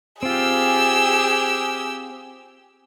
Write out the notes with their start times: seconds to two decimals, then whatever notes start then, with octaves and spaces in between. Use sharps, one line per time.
0.23 C4 F4 G4 G#4 E6